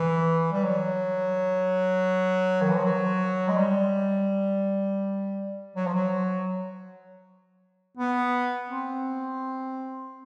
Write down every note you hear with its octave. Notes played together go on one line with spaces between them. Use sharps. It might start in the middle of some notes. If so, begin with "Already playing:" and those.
Already playing: E3
G3
F#3
D#3
E3
F3
F#3
G#3
G3
F#3
F3
F#3
B3
C4